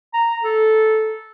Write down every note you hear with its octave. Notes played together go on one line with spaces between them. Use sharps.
A#5
A4